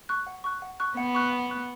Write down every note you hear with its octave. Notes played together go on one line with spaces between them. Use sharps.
C#6 F#6
F#5
C#6 F#6
F#5
C#6 F#6
B3 F#5
C#6 F#6
F#5
C#6 F#6